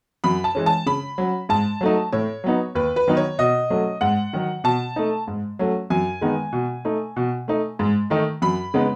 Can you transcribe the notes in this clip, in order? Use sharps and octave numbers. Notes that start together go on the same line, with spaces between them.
F#2 B5
A5
E3 G#3 C#4
A5
C#3 B5
F#3 C#4
G#2 A5
F#3 A3 D#4
A2 C#5
F#3 B3 D#4
D#2 B4
B4
D#3 F#3 B3 D#4
C#5
B2 D#5
F#3 A3 C#4
G#2 F#5
D#3 F#3
B2 A5
A3 D#4
G#2
F#3 A3 C#4
F#2 G#5
D#3 G#3 B3 D#4
B2
A3 D#4
B2
A3 D#4
G#2
D#3 A3 D#4
F#2 B5
C#3 G#3 B3 D#4